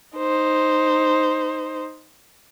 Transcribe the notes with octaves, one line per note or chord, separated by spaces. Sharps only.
D#4 C5